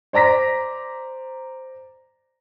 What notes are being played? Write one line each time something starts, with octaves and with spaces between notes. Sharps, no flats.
C5 D5 A#5 A#6 B6